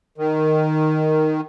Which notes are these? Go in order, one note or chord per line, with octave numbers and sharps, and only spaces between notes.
D#3